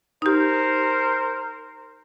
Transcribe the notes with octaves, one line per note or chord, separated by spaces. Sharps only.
D#4 G4 A#4 C5